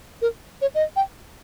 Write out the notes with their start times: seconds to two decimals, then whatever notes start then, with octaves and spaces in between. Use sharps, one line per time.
0.22 A#4
0.61 C#5
0.75 D#5
0.96 G5